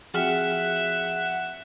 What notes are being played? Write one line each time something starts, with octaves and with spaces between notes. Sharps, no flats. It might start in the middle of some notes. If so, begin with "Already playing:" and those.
F3 C4 F#4 G#4 E5 F#5 G5 F6